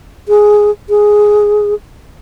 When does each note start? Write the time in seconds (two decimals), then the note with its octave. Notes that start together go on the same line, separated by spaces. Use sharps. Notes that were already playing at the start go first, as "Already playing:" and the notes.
0.28 G#4
0.89 G#4